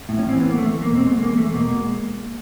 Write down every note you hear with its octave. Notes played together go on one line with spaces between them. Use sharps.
A2
C#4
E3 C4
A3 B3
A#3
E2 A3
E2
A#3
B2
C4
G#3 A3 B3
E2 A#3
E2 A3
B2 A#3
G#3